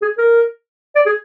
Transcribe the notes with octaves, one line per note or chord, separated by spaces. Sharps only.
G#4
A#4
D5
G#4